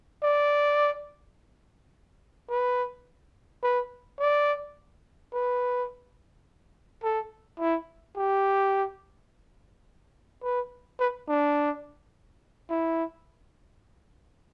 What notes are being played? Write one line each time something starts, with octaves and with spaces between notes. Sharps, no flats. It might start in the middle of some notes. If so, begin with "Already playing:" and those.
D5
B4
B4
D5
B4
A4
E4
G4
B4
B4
D4
E4